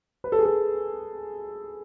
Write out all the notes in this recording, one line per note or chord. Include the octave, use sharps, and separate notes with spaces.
B4
A4
G#4
A4